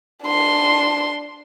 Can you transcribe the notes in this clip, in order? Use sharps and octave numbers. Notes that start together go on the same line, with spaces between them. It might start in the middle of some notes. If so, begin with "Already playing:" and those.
D4 C6